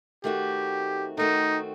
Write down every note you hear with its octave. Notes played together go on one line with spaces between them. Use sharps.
D#3 A3 C4 F#4 G4
D#3 A3 C4 D#4 F#4